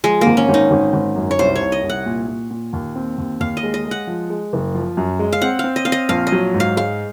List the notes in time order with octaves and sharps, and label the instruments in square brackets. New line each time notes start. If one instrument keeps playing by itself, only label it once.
[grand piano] F3 [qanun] G#3
[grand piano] G#1 [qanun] A#3
[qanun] C#4
[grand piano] G#1 [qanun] D#4
[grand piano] G#1
G#1
F#2
[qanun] C#5
[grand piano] C2 [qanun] C5
[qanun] C#5
[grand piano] C2
[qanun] D#5
[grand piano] C2
[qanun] F#5
[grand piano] A#2
A#2
A#2
D#2
C4
D#2
[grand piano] D#2 [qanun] F5
[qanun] D#5
[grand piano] G#3
[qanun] D#5
[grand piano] G#3
[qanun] F#5
[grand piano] F3
G#3
F#1
F3
F#2
G#3
[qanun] F5
[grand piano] C4 [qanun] F#5
[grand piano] C4 [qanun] F5
[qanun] D#5
[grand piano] C4 [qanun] F5
[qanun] D#5
[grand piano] A#1 [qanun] F5
[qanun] D#5
[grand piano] F#3
G#2
[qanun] F5
[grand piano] G#3 [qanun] F5